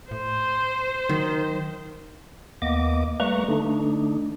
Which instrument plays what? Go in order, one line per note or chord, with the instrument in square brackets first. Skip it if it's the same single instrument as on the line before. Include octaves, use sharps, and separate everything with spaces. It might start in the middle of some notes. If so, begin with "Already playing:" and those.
[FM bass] A2 [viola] C5
[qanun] D#3 [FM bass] F#3
[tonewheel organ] D#2 A#3 B3 D#5 D6
G3 A3 A#3 B4 A#5 C#6
D3 A3 D4 D#4